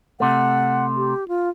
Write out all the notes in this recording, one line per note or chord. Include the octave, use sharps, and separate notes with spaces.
C3 A3 F#5
G4
F4